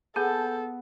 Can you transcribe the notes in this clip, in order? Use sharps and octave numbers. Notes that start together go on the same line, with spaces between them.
B3 G#4 A4 G#5 A5 G6